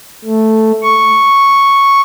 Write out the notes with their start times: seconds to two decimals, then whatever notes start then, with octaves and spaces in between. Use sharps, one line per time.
0.24 A3
0.83 C#6